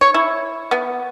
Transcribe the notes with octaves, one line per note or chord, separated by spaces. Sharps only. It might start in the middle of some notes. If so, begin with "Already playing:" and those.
C#5
E4
B3